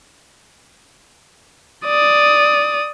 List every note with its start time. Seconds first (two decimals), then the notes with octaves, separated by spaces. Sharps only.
1.85 D5 D#6